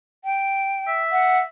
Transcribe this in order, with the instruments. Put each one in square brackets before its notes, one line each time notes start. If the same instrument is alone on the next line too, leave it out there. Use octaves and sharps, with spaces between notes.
[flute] G5
[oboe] E5
[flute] F#5